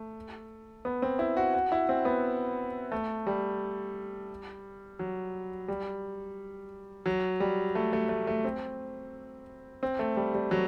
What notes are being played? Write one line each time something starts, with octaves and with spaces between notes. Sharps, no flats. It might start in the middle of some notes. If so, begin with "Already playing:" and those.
Already playing: A3
B3
C4
E4
F#4
F#4
E4
C4
B3
A3
G3
F#3
G3
F#3
G3
A3
A3
A3
A3
C4
C4
A3
G3
G3
F#3